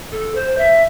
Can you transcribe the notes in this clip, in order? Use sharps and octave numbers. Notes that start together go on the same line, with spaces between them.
A4
C5
E5